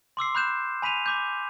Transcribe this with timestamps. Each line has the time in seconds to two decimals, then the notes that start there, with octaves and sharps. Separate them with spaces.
0.17 C6 D6 E6 C7
0.35 B5 F#6 G6 E7
0.82 G#5 B5 B6 D#7 F7
1.06 B5 D6 G6